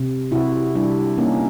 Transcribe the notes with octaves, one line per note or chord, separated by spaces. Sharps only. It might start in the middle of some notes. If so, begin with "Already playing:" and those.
Already playing: C3
C3 E4 F#4
G3 D4 E4
A#3 C#4 D#4